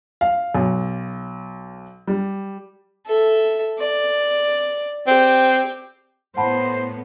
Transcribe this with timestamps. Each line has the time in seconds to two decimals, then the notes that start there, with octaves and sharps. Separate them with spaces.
0.21 F5
0.55 B1
2.07 G3
3.06 A4 E5
3.78 D5
5.07 C4 G4
6.37 A2 B3 C5 F#5 A5 B5